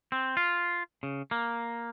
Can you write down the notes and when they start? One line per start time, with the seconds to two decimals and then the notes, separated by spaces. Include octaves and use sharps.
0.12 C4
0.37 F4
1.03 C#3
1.31 A#3